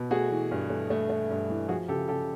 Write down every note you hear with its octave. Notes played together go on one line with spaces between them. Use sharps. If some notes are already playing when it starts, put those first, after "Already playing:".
Already playing: B2
A3 F#4 G#4
E3
G2
A3
A3
A3
G2
E3
F3 F#4 G#4
C#3 G4 A4
C#3 G4 A4